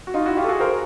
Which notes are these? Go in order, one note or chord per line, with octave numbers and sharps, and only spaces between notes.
F#4
D#4 F4
E4 F#4
F4 G4
A4
F#4 G#4
A#4 C5